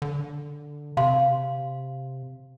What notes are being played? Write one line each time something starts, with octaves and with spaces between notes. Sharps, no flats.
D3
C3 F5 C6